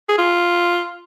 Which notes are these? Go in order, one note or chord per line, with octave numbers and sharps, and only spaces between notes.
G#4
F4